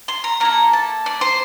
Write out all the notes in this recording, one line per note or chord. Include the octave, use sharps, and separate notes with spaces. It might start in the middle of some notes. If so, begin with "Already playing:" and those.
C6
A#5
A#3 E4 A4 A#5
A5
D5
C5